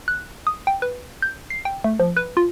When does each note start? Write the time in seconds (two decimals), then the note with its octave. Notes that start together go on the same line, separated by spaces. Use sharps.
0.08 F#6
0.47 D#6
0.67 G5
0.82 B4
1.22 G6
1.50 C7
1.65 G5
1.84 A3
2.00 F3
2.17 B4
2.37 F4